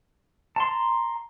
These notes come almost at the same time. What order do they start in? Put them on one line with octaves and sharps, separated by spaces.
A5 C6 A#5